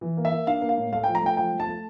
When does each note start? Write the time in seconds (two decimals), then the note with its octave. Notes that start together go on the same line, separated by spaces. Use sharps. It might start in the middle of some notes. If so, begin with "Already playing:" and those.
0.01 E3
0.17 A#3
0.25 E5
0.32 A#3
0.47 D4 F5
0.61 A#3
0.69 F5
0.78 A2
0.92 A3 F5
1.04 F3 G5
1.15 A#5
1.21 A3 G5
1.37 F3 G5
1.53 A3
1.60 A5
1.67 A3